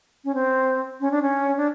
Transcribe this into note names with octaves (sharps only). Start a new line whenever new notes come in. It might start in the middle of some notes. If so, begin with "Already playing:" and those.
C#4
C4
C#4
D4
C#4
D4